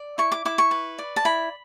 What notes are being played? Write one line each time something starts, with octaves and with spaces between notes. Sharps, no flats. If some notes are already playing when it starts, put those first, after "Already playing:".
Already playing: D5
E4 C#6
D6
E4 D6
C#6
B4
D5
A5
E4 B5